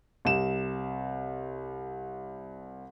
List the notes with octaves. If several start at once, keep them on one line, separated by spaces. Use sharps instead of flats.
C2 E7